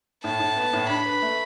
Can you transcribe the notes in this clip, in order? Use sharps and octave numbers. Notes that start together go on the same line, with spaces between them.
A2 A5
A2
B3
A2
D4 B5
B4
A3